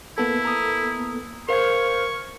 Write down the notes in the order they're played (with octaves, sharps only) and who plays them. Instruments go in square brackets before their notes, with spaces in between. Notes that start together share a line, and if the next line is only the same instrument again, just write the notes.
[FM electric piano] A#3 B3 A4 [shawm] E4
[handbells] A#5 D#6
[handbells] A#4 C5 F5 [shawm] C#6 [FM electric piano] F6 G#6